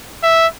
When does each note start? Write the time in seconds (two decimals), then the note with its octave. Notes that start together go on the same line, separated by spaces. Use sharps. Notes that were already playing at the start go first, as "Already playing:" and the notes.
0.23 E5